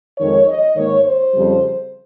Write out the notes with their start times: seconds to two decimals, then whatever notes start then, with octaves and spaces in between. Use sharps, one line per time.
0.18 F2 D#3 G#3 C#5
0.47 D#5
0.76 G#2 D#3 A#3 C#5
1.05 C5
1.34 F2 C#3 G3